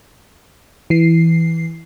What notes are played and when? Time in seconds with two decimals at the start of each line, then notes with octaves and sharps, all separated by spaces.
0.90 E3 C7